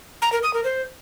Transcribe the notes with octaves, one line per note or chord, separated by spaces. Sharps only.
A#5
A#4
D#6
A#4
C5